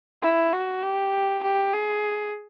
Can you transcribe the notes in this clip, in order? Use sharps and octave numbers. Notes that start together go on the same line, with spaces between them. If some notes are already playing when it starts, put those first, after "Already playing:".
E4
F#4
G4
G4
G#4